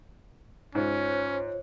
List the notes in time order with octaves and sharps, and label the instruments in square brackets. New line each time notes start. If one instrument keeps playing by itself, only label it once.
[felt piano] G#2 [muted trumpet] C#4 [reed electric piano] F4 C5 [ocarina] C#5